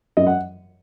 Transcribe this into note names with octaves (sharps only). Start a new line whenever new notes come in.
F#2 D#5
F#5